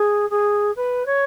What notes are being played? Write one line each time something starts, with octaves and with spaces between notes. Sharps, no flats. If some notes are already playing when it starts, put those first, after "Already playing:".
Already playing: G#4
G#4
B4
C#5